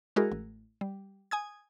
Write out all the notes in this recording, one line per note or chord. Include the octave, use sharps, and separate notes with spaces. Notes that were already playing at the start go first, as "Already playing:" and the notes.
G#3 E4 F#4 G#4 A#4
A1
G3
G#5 D#6 G#6